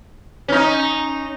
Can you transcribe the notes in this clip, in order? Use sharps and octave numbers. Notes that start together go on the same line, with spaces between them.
C#4 D#4